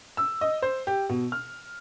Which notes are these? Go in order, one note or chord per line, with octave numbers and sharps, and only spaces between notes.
E6
D#5
C5
G4
B2
F6